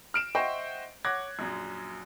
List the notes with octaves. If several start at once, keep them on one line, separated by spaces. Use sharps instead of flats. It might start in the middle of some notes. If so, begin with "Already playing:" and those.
F6 D7 E7
C5 D#5 E5 F#5 G5 C#6
C#5 F#5 D6 F#6 G#6 A#6
A#1 F#2